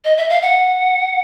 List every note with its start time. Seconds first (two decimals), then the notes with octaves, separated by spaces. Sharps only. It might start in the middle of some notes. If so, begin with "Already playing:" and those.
0.05 D#5
0.17 E5
0.30 F5
0.42 F#5